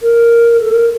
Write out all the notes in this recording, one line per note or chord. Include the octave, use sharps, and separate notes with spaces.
A#4
A4
A#4